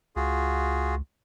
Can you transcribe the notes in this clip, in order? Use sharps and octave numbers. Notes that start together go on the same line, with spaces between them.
C#2 F4 F#4 G#4